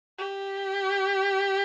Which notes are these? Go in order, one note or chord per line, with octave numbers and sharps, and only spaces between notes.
G4